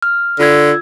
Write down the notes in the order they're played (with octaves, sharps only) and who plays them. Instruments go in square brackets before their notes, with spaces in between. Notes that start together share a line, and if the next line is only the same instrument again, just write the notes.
[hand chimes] F6
[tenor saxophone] D3 [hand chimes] F4 E6 G#6